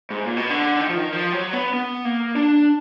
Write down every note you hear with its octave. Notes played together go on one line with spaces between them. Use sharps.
G#2
A#2
B2
D3
D#3
F3
D#3
F3
F#3
B3
B3
A#3
D4